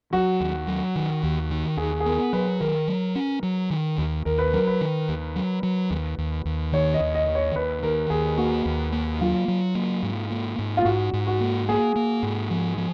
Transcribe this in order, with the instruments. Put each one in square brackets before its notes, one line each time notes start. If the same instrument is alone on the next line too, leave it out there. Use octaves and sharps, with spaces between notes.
[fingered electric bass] F#3 [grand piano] F#4
[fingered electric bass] D#2
F#3
D#3
D#2
D#3
[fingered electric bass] D#2 [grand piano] G#4
[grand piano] G#4
[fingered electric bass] B3 [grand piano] A#4
[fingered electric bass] F#3 [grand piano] B4
[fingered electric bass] D#3 [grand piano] A#4
[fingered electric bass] F#3
C#4
F#3
D#3
D#2
[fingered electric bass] D#2 [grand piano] A#4
[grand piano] B4
[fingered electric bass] F#3 [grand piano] A#4
[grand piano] B4
[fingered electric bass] D#3
D#2
F#3
F#3
D#2
D#2
D#2
[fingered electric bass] D#3 [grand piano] C#5
[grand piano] D#5
[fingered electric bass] D#2
[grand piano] D#5
[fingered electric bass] D#3
[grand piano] C#5
[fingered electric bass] D#2 [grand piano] B4
[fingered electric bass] D#3 [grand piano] A#4
[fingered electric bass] D#2 [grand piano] G#4
[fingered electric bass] A#3 [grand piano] F#4
[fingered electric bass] D#2
A#3
[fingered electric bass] F#3 [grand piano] F4
[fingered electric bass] F#3
A#3
G#2
A#3
G#2
[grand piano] F4
[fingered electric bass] G#2 [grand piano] F#4
[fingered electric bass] G#2
[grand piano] F#4
[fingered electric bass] A#3
[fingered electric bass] A#3 [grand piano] G#4
[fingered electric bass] A#3
G#2
F3
F3